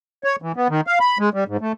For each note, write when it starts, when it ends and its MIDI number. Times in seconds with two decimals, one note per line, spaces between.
0.24 0.36 73
0.42 0.52 52
0.56 0.68 59
0.70 0.81 51
0.87 0.99 77
1.00 1.18 83
1.19 1.29 56
1.34 1.44 55
1.48 1.57 44
1.61 1.72 57